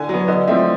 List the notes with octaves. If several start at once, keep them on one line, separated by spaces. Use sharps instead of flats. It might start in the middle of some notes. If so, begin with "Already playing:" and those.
Already playing: D3 G#5
F#3 B3
D3 D#5
F3 A3 C4 E5